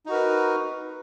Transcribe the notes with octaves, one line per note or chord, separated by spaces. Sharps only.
D#4 F#4 A#4 B4